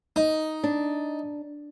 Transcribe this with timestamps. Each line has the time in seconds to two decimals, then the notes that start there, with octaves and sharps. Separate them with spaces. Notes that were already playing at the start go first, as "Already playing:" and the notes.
0.16 D#4
0.64 D4